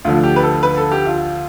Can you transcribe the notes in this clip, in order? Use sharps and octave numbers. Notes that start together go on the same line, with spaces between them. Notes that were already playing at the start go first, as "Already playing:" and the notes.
D2 D3 F3 F4
G4
B4
A4
B4
A4
G4
F4